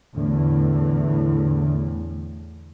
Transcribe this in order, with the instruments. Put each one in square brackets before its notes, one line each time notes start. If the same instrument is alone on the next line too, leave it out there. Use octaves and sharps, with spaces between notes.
[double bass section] E2 A2 [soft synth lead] D3